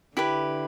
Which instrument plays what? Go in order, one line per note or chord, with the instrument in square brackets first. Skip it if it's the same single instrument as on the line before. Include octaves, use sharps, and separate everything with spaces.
[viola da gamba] D3 [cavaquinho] E4 G4 B4